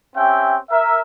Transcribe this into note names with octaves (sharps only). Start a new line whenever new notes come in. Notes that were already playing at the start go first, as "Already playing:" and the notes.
C4 C#4 G4 E5 G5
A#4 E5